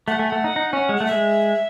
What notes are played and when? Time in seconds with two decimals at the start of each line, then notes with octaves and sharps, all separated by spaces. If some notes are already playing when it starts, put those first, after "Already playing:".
0.07 A3 F#5
0.18 A3 G#5
0.29 A3 F#5
0.44 D#4
0.56 D#4
0.73 C#4
0.89 G#3
0.96 A3 F#5
1.06 E5
1.11 G#3